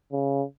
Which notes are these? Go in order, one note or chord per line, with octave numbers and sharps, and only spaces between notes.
C#3